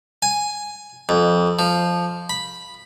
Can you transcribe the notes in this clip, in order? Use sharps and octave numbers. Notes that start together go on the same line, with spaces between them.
G#5
F2
F3
B5